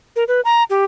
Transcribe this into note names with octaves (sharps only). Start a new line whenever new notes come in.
A#4
B4
A#5
G4